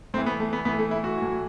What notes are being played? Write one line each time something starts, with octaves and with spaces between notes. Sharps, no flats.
A2 E3 C4
B3
A3
B3
A2 E3 B3
A3
E4
F#4
A2 E3